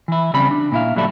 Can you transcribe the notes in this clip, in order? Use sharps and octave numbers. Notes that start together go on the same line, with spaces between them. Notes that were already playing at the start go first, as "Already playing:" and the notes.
E3 E4
C#3 G3 C4 B5
D4
A#2 E4 F5
A#2 D3 F#3 G3 E4 A4